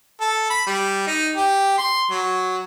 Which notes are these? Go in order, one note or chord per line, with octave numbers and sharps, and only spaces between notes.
A4
B5
G3
D#4
G4
C6
F#3